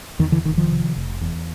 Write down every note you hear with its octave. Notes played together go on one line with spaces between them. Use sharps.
E2 D#3
D3 E3
F1 D#3
D#3 F3
C3
F1
E2